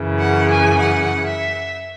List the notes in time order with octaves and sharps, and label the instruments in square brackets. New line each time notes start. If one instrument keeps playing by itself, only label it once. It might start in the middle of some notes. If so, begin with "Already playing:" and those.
Already playing: [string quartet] F#2 C#3 E3
F#5
G#5
F#5
E5